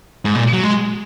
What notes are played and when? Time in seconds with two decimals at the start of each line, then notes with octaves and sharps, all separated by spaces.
0.25 G#2
0.35 A#2
0.53 F#3
0.63 G#3